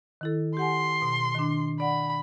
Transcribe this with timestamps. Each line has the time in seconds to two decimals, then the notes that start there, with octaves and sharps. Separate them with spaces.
0.21 D#3 E4 A4
0.57 G4 F#5 G#5 C6
1.02 B2
1.35 D#3 D4
1.80 D5 F#5 B5